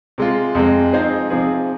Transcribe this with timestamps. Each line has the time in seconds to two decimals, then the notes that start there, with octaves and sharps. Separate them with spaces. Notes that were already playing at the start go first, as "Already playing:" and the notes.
0.18 C3 G#3 F4
0.55 F2 C3 G#3
0.93 F3 C4 D#4 G#4 C5
1.30 C3 F3 C4 D#4 G#4